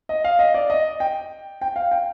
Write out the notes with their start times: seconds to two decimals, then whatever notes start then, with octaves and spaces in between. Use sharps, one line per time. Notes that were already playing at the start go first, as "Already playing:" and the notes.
0.09 D#5
0.24 F5
0.39 D#5
0.54 D5
0.70 D#5
1.00 G5
1.61 G5
1.76 F5
1.91 G5